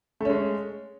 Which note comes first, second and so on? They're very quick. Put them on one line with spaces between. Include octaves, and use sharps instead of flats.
A3 C#4 G#3